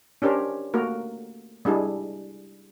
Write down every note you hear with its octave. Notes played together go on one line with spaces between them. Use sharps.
C#4 D4 G4 A#4 C5
A3 A#3 F#4 A#4
G3 G#3 D4 E4 G#4